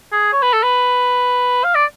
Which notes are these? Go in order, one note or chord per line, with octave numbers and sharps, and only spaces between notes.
G#4
C#5
B4
A4
B4
F5
D5